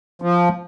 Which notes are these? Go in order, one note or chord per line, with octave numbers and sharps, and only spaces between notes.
F3